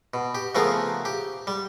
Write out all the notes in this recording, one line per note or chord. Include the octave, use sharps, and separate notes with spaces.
B2
G4
C#3 F3 A3 B3 F4 A#4
G4
G3